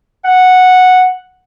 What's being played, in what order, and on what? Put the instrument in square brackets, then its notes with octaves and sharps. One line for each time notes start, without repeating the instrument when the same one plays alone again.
[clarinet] F#5